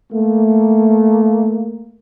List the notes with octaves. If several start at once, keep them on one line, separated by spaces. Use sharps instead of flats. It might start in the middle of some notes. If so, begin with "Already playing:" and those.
A3 A#3